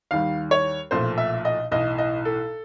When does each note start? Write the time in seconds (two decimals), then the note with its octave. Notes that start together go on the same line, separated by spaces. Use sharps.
0.11 D#2 D#3 G3 F5
0.51 C#5
0.91 B1 A#2 F3 A3 C5
1.18 E5
1.45 D#5
1.71 B1 A2 E3 D#5
1.98 D#5
2.25 A4